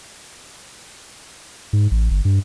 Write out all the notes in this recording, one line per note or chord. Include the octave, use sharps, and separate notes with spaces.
G#2
A1
G1
G2